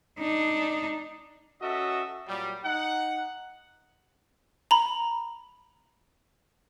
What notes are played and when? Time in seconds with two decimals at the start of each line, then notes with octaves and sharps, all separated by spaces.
0.19 D4 D#4
1.62 C#4 F#4 A4 D#5 E5
2.28 A#2 F#3 G3
2.64 D#4 F#5
4.71 A#5 B5